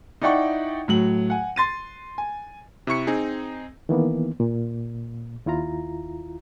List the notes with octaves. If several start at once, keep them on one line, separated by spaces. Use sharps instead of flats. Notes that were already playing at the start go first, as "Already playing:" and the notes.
D#4 E4 D5 F#5 G5 C#6
A2 F#3 F#7
F#5 G#5
C6 A6 D#7
G#5
C3 E4 C#6 C#7
C4 D#4 G#4
D#3 E3 A#3 B3
A#2
D#2 E4 F4 A#5